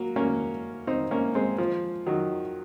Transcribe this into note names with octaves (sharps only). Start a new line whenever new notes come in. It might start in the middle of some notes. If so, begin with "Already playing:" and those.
Already playing: F#3 A#3
A#3 C#4
C4 D#4
A#3 C#4
G#3 C4
F3
D#3 F#3